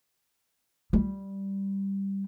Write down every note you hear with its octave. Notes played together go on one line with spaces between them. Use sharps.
G3